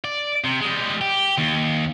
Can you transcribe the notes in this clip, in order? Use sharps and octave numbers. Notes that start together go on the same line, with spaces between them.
D5
C3
G3 G#3
G4
D#2